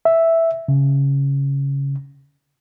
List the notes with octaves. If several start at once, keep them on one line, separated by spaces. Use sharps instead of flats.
E5
C#3